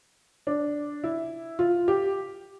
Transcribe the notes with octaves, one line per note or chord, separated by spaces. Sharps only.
D4
E4
F4
G4